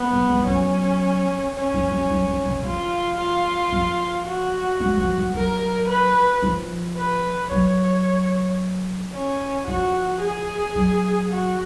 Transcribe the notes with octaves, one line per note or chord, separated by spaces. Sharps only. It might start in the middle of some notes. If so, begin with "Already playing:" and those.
Already playing: B3
F#3
G#3
F3
F#3 C#4
C#4
F3
F#3
F#3
F3
C#3
F3 F4
F4
F3
F#4
G#3
F3
F#3
F#3 A#4
B4
F3
B4
F#3 C#5
C#4
F3 F#4
G#4
F#3
F#4